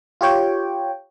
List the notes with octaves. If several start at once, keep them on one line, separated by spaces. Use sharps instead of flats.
F4 G4 C#5 G5